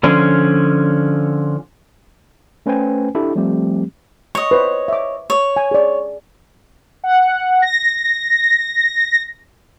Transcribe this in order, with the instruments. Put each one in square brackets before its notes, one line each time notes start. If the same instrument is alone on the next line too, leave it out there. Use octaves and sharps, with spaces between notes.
[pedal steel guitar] D3 F3 C#4 C6
[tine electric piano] A3 C#4 B4 C5 G5 G#5
D4 E4 G4 A4
F3 G3 A3 C4 G4
[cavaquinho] C#5 D#5 [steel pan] C#6
[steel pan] B4 C5
E5 D6
[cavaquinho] C#5
[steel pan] G#5
G#4 D5
[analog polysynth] F#5
A#6